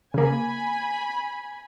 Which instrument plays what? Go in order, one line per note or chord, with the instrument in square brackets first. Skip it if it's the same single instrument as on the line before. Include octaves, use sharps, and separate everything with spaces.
[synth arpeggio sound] C#3 A#3 [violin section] G#5 B5